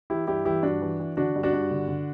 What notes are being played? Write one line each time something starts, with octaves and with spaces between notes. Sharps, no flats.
E3 E4 G4
G2 E4 G4
E3 E4 G4
G2 D4 F#4
E3
E3
D3 D4 F#4
G2
D4 F#4
G2
D3
D3